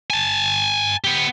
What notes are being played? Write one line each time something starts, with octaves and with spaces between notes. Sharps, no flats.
G#5 A5
B3 G4